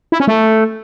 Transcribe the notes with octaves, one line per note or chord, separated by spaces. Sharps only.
E4
C#4
A3